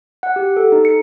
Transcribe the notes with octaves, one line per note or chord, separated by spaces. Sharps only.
F#5
G4
A4
D#4
C#7